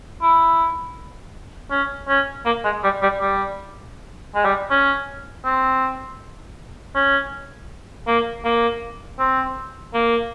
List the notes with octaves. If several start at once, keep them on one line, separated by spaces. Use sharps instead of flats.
E4
C#4
C#4
A#3
G#3
G3
G3
G3
G#3
G3
C#4
C4
C#4
A#3
A#3
C4
A#3